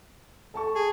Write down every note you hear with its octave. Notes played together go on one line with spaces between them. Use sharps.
A4 A5 C#6
G#4